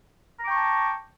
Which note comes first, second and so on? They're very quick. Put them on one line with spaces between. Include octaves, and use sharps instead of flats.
A#5 D6 G5 C#6 A5